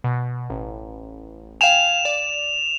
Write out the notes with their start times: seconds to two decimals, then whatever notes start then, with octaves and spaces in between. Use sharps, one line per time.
0.04 B2
0.50 A1
1.61 F5 G5 G#5 E7 F7
2.05 D5